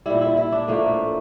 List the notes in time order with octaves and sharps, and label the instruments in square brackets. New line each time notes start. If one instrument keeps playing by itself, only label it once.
[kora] A#2 G3 E4
E4
E4
D4
A2 F3 A3 A#3